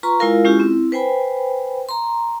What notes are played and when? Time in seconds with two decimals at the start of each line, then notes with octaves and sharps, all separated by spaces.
0.03 F4 B4 A#5 C6 C#6
0.20 G#3 E4 F4 A#4 F5
0.45 G#3 C#4 E4 F4 G4 G#4
0.60 C4 E4
0.92 B4 C5 G5 G#5 B5
1.89 A#5 C6